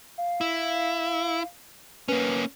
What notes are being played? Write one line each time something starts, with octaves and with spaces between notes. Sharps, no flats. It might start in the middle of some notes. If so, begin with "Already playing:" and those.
F5
E4
A#3 C#4 B4